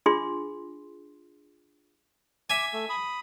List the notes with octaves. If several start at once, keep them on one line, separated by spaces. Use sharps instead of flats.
D4 F4 G#4 C6
E5 G#5 D6
A3
B5 D#6